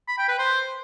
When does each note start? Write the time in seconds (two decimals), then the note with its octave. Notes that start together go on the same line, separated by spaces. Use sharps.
0.08 B5
0.18 G5
0.29 B4
0.39 C5